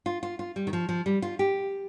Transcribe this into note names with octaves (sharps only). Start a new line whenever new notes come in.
F4
F4
F4
G3
D#3
F3
F3
G3
F4
G4